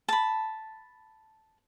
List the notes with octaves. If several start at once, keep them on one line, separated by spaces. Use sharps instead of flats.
A5 B5